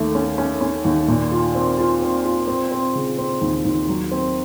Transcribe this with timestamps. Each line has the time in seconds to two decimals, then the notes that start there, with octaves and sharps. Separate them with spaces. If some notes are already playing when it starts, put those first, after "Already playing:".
Already playing: D#2 A3
0.15 C#4
0.38 C#4
0.61 C#4
0.85 D#2
1.08 A#2
1.32 F4
1.55 C4
1.78 F4
2.01 C4
2.25 F4
2.48 C4
2.71 C4
2.95 C#3
3.18 C4
3.41 D#2
3.65 D#2
3.88 F#3
4.11 C4